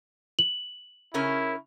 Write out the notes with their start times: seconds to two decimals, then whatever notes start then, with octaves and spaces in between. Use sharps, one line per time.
0.39 F#7
1.14 C#3 C#4 E4 A#4